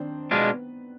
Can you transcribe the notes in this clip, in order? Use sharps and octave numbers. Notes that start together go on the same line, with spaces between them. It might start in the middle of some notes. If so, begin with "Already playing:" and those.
Already playing: D#3 C4 D4 C5
B2 G#3 B3 D4 F4 B4